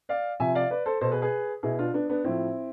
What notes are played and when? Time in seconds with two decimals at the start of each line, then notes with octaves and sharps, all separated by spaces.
0.09 D5 F5
0.39 C3 F3 E5 G#5
0.55 D5 F5
0.70 B4 D5
0.86 A4 C5
1.01 B2 A4 C5
1.12 G#4 B4
1.22 G#4 B4
1.63 B2 E4 G#4
1.78 D4 F4
1.94 B3 D4
2.09 B3 D4
2.24 A2 F3 C4 E4